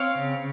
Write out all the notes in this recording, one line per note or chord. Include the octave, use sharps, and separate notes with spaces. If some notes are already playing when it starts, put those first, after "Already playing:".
Already playing: C4 C#5 F5
C#3